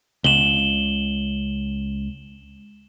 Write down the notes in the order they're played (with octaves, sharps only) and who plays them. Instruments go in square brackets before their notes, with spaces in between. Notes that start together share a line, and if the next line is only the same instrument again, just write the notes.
[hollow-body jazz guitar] C#2 [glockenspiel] E7 F#7 G7